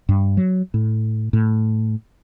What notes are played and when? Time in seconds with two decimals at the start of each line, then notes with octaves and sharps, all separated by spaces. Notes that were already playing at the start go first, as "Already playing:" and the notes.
0.09 G2
0.37 F#3
0.74 A2
1.33 A2